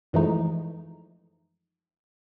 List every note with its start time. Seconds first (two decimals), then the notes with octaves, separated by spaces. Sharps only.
0.13 F#2 E3 F3 G#3 A3 D#4